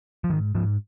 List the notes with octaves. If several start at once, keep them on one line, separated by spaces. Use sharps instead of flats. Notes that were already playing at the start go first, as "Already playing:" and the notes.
F3
G#2 D#3
G#2 F3